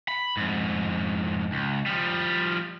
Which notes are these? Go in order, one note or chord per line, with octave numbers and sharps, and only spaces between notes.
B5
F2 G#2
C#2
F3 G3